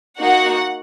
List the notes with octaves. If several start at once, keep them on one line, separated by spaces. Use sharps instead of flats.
A#3 D#4 F#4 F#5